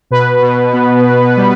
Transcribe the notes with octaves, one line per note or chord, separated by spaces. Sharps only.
B2 B4
B2
B3
B2
G3